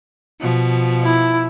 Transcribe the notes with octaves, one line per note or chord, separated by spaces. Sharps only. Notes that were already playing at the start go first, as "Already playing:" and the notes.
B2 F3
E4